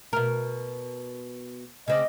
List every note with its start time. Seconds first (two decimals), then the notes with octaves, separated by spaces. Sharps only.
0.13 B2 A#4
1.88 C#3 C4 D5 D#5